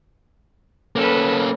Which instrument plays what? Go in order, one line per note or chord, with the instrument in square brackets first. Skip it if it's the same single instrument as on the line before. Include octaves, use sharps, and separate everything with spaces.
[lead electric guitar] A#3 C#4 [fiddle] A4 B4